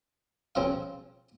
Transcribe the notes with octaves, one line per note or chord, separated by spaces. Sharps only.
C#3 F3 C4 F5